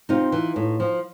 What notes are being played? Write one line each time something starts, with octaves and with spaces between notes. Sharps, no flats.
C3 D#4 F4
E3
A2
F3